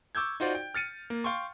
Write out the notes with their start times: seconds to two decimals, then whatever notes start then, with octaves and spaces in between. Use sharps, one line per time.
0.15 C#6 D6 E6 G6 G#6
0.40 D#4 F4 F#4 C5 D5
0.55 G5
0.74 F6 A6 C#7 D#7
1.10 A#3
1.24 F5 G5 C6 C#6